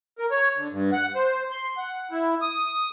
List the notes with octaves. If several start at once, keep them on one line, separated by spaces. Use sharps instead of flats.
A#4
C#5
D3
G2
F#5
C5
C6
F#5
E4
D#6